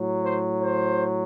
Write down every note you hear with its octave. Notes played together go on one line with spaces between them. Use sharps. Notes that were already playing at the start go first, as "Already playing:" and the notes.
Already playing: A2 F#3
C5
C5